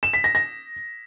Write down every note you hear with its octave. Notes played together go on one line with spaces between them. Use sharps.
E7
B6
A#6
A#6